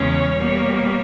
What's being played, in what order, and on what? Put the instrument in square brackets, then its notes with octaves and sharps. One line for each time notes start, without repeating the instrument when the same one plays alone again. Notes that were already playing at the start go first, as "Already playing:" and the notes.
Already playing: [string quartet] E2 C#3 G#3 C#4 C#5
B2 G3 A#3